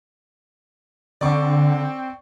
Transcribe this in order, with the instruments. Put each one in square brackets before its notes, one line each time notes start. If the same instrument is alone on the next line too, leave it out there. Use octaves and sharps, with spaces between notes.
[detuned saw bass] D3 [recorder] C4 [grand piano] D5 C#6